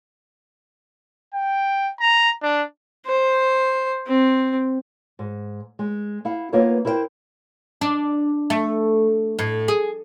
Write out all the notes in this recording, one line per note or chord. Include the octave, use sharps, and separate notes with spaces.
G5
A#5
D4
C5
C4
G#2
G#3
E4 F5 F#5
A#3 B3 D#4 F4 B4 C#5
E4 A#4 C5 E5 G5
D4
A3
A2
G#4